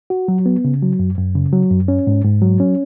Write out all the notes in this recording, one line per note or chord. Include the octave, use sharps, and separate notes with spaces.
F#4
F#3
B3
C#3
F#3
F#2
F#2
C#3
F#3
F#2
C#4
G#2
G#2
F#3
C#4